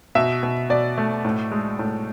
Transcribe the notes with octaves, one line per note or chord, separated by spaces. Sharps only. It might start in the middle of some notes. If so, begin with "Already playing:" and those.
B2 E5
B2
B2 D5
A3
A2
G#3
A2